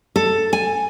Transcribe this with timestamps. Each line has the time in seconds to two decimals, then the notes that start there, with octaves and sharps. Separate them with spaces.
0.16 A4
0.53 G#5